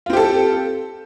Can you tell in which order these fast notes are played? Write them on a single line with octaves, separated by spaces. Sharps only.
F4 C4 G4 A4